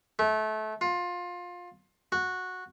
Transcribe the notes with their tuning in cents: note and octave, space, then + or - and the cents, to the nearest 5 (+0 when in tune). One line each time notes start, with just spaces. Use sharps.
A3 -25
F4 +20
F#4 -10